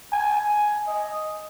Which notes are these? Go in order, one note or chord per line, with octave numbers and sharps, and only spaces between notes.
G#5
G#5
D#5